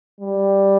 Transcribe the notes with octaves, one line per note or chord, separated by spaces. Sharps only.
G3